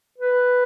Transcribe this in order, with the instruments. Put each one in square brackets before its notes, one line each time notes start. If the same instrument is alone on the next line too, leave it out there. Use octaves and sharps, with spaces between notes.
[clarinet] B4